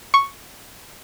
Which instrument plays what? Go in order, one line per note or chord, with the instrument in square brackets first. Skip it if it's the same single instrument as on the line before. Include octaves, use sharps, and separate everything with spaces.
[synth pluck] C#6